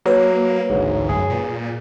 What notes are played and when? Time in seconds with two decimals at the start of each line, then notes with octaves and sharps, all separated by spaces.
0.06 F#3 A#3 B4 C#5 A#5
0.70 A1 D2 G#2
1.09 F#2 G#4
1.30 A#2